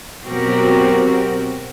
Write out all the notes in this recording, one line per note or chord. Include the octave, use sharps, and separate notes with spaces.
B2 F#3 C4 F#4 G4 A#4